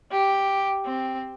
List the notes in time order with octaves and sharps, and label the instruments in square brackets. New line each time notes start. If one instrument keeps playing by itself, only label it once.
[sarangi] G4
C4